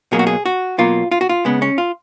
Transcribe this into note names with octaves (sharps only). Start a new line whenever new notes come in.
B2 F#3 A#3 G#4
F#4
G#4
F#4
B2 F#3 A#3 F4
F4
F#4
F4
C#3 G#3 B3
C#4
F4